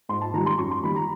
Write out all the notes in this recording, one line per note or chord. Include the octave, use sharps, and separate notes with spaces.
G#2 C6
A5
D#3 G3 A#5
C6
F#2 C#6
C6
D#3 G3 B5
A#5